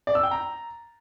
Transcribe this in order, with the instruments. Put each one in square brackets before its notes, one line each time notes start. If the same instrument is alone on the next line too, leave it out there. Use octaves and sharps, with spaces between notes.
[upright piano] D5
E6
G5
A#5